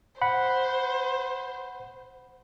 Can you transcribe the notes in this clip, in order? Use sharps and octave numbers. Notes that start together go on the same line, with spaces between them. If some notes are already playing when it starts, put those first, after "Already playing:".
C5 F#5 B5